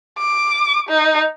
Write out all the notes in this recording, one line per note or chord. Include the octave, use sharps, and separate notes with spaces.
D6
D#4